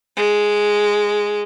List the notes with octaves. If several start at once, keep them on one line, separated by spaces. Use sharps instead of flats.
G#3